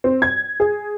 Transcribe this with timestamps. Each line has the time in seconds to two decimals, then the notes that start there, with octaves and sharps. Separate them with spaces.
0.04 C4
0.22 G#6
0.60 G#4